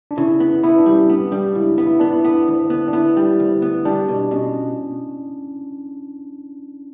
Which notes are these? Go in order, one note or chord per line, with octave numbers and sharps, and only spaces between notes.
D4
C#3 E4
B3
B3 E4
D4
G3
C#4
B3
G3 D4
C#2 E4
B3
E4
B3 D4
E4
B3
D2
B3
D4
B3 E4
G3
D2
B3
G3 D4
B2
B2 C#4